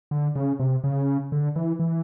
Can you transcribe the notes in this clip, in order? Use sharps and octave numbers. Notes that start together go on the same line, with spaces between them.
D3
C#3
C3
C#3
D3
E3
E3